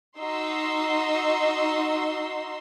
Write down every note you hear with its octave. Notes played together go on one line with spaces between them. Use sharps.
D#4 F#4 C6 E6